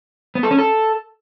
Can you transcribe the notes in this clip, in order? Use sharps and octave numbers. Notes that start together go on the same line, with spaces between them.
B3
A4
C#4
A4